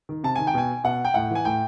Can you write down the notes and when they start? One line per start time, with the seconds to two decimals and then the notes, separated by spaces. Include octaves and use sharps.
0.09 D#3
0.24 C3 A5
0.36 D#3 G#5
0.47 G5
0.54 B2 G#5
0.84 B2 F#5
1.05 G5
1.14 A2 F#5
1.30 E3 G#5
1.45 A2 G5